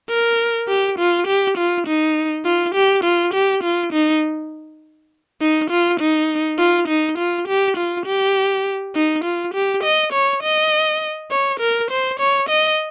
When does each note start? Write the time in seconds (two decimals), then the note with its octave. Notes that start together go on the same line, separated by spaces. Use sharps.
0.09 A#4
0.69 G4
0.99 F4
1.27 G4
1.58 F4
1.87 D#4
2.46 F4
2.75 G4
3.04 F4
3.34 G4
3.63 F4
3.93 D#4
5.41 D#4
5.70 F4
5.99 D#4
6.59 F4
6.88 D#4
7.18 F4
7.48 G4
7.77 F4
8.06 G4
8.95 D#4
9.24 F4
9.54 G4
9.83 D#5
10.13 C#5
10.43 D#5
11.31 C#5
11.60 A#4
11.91 C5
12.20 C#5
12.49 D#5